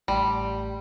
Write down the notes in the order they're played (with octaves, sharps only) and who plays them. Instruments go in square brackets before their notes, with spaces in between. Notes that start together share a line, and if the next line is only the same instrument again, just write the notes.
[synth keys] A1 [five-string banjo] G3